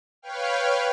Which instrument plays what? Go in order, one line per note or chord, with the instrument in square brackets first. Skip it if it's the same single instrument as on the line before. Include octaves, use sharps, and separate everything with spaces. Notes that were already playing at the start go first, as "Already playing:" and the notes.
[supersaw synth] B4 C#5 F5 G5 F6